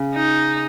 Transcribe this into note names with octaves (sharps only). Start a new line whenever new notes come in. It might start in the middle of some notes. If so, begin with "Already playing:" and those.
Already playing: C#3
D#4